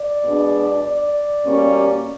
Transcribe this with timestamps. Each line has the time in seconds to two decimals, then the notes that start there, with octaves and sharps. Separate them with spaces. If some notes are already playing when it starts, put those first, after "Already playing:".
Already playing: D5
0.24 B2 G#3 B3 D4
0.85 D5
1.45 B2 G3 A#3 C#4